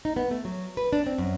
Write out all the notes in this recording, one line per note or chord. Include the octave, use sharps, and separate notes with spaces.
D#4
B3
A3
F#3
B4
D4
C4
F#2